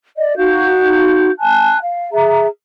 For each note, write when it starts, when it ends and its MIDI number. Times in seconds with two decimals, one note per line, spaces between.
0.17 0.34 74
0.17 0.34 75
0.37 1.29 63
0.37 1.29 66
0.37 1.29 77
0.37 1.29 91
1.40 1.77 80
1.40 1.77 81
1.40 1.77 90
1.82 2.08 77
2.12 2.47 68
2.12 2.47 76
2.12 2.47 82